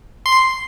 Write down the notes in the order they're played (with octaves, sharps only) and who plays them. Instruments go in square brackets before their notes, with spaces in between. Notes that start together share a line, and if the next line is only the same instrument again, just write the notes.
[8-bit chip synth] C6